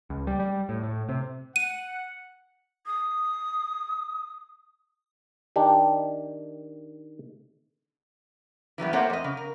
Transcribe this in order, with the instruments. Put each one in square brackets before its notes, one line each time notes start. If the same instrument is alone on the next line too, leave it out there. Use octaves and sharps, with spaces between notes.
[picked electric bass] C#2
G3
G3
A2
A2
C3
[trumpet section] F#5 [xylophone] D#7
[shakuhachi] D#6
[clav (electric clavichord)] D#3 D4 G4
[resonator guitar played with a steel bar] E3 F#3 G3 B3
A3 A#3 C4 C5 C#5 F#5
F2 D#5
C#3
A#4